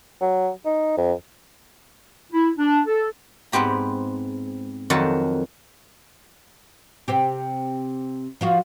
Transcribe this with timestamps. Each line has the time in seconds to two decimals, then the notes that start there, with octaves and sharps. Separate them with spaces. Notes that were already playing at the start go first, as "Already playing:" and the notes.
0.21 F#3
0.66 D#4
0.97 F2
2.33 E4
2.58 D4
2.87 A4
3.52 G#2 B3 C4 G4 A#5
4.90 F2 D#3 F#3 A4 A5
7.08 C3 C4 G4
8.41 F3 F4 F#4